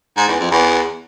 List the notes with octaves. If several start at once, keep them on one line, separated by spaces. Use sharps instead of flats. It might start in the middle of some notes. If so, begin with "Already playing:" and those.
G#2
E2
F2
E2